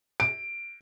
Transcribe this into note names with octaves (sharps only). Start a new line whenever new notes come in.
D7